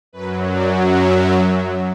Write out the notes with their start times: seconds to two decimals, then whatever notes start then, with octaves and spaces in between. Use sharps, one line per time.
0.13 F#2 F#3 B4
0.51 D5
0.89 E5